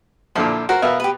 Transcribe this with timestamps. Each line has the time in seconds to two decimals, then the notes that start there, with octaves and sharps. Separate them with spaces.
0.35 A#2 D3 F3 E4 C6
0.69 F#4 A#4 C5
0.82 B2 B3 A#4 E5 F5
1.00 G4 B4